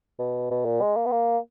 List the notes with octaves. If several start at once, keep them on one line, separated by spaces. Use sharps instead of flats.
B2
B2
A#2
G#3
A#3
B3
A#3